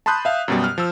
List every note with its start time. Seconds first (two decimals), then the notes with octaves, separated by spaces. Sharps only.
0.06 A5 B5 C6 D#6 F#6 G6
0.25 E5 F5
0.48 F#2 B2 G3
0.64 F6
0.78 F3 E6